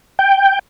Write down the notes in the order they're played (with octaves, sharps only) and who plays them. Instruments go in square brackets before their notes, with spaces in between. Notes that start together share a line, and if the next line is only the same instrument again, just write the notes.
[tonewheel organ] G5